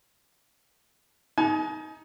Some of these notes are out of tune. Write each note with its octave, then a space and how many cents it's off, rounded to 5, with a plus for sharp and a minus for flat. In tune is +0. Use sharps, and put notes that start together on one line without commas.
D#4 +15 G#5 +40